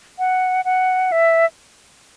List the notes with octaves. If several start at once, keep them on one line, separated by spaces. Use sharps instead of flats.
F#5
F#5
E5